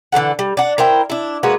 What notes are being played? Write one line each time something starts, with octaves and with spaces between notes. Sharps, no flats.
D3 E3 A4 F#5
G3
D4 F#5
E4 A#4 C5 G5
D4 E4
G#3 A#3 F#4 B4